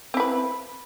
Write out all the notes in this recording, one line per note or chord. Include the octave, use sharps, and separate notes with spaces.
C4 E4 B4